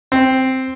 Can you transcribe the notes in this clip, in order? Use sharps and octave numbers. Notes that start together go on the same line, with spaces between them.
C4